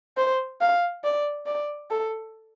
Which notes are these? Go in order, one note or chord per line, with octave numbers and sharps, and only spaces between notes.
C5
F5
D5
D5
A4